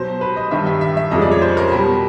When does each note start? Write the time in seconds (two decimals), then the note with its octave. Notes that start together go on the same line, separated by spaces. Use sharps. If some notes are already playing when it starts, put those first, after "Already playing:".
Already playing: B2 F#3 C5
0.21 B4
0.36 D#5
0.51 G2 D#3 G3 E5
0.66 E5
0.81 E5
0.97 E5
1.11 F2 C#3 F3 G#3 D#5
1.22 D5
1.31 C#5
1.42 C5
1.57 A#4
1.72 B2 G3